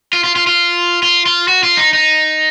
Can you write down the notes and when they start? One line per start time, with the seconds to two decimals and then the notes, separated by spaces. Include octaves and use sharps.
0.13 F4
0.24 F4
0.36 F4
0.47 F4
1.03 F4
1.26 F4
1.48 F#4
1.63 F4
1.77 D#4
1.93 D#4